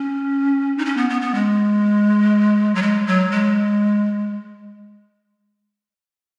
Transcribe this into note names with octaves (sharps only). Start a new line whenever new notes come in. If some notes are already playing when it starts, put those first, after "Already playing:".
Already playing: C#4
D#4
C#4
B3
B3
B3
G#3
F#3
G#3
F#3
G#3